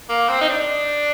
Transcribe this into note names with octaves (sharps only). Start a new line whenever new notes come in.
A#3
C4
D#4
D4